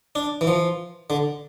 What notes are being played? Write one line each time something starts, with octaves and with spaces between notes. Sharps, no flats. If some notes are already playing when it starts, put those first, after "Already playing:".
D4
E3
F3
D3